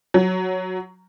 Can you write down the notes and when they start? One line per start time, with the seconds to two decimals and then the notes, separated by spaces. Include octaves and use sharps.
0.14 F#3